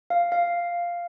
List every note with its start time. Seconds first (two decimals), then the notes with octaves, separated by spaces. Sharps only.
0.10 F5
0.32 F5